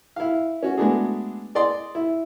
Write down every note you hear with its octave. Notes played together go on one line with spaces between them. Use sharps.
E4 F5
C#4 F#4
G#3 A3 B3 D4 F#4 G#4
G#4 D5 D#5 C6
E4